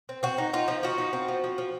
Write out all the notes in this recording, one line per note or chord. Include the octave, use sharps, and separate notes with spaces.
C4
C4 F#4
D#4
D#4 F4
F3
F3 F#4
D#4
C4
F3
F3
F3